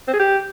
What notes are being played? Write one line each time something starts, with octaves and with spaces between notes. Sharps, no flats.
C4
G#4
G4